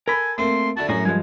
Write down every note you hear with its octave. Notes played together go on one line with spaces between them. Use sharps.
A4 A#4 G#5 B5
A3 A#3 C4 C6
D3 E4 F#4 A5
F#2 A2 F#4 G#4 A#5
G2 F3 G#3 G#5